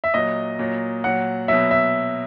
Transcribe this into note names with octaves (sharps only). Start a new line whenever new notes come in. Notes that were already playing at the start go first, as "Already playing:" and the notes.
E5
A#2 F#3 D#5
A#2 F#3
A#2 F#3 F#5
B2 F#3 E5
E5